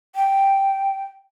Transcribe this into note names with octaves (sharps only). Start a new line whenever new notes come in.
G5